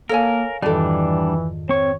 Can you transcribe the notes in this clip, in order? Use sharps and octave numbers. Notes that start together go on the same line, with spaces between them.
A#3 A4 A#4 C#5 F5 G#5
F2 G#2 D#3 E3 G3 D4 A4 D5
C4 C#5 C#6